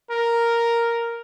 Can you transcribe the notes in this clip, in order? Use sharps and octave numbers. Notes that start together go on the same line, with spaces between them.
A#4